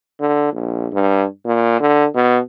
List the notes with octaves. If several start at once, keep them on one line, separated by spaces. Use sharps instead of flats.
D3
A#1
G2
A#2
D3
B2